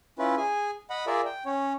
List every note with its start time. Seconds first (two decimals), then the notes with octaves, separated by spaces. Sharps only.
0.19 C#4 E4 F4 B4
0.37 G#4 G#5
0.90 D#5 F#5 B5
1.07 F4 G#4 A#4 D5 E5
1.25 G5
1.46 C#4 C#5